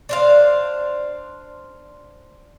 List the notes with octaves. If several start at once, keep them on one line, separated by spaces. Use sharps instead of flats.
D4 C5 F5